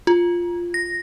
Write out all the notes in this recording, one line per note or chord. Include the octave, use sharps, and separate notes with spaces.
F4
A#6